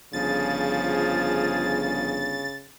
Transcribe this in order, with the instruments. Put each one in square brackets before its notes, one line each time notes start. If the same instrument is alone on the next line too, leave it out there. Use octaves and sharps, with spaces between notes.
[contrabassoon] G1 [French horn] C#3 [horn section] F3 G#4 [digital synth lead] A6